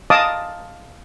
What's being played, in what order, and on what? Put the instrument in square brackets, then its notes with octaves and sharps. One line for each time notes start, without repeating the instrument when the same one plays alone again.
[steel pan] D#5 F5 A5 D6 D#6